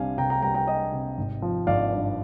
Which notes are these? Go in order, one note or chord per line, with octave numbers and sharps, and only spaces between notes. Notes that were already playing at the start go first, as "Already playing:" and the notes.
Already playing: C2 C3 G3 D4 F5 G#5
C2 G5 A#5
G5 A#5
G3 G5 A#5
G5 A#5
D4 D#5 G5
C3
G#1
F3
G#1 D5 F5
G2